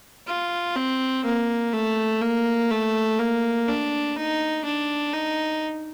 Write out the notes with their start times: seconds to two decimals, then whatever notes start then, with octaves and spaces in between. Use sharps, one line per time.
0.27 F4
0.76 C4
1.24 A#3
1.73 A3
2.22 A#3
2.71 A3
3.19 A#3
3.68 D4
4.17 D#4
4.65 D4
5.14 D#4